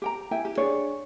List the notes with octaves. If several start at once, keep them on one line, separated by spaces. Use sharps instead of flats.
G4 G5 A#5
E4 E5 G5 G#5
G4
D4 G#4 C#5 D5